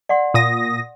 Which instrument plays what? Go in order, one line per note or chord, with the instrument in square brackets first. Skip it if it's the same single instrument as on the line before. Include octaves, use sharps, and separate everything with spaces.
[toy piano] D5 F#5 C6
[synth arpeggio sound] A#2 D#6 A#6